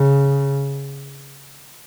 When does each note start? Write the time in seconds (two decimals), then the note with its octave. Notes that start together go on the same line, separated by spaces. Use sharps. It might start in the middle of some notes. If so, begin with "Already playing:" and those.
Already playing: C#3